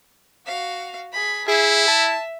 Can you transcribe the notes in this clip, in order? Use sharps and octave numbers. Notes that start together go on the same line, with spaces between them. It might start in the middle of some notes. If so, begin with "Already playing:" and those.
F#4 F5
G#4 B5
E4 G#4 E5
A5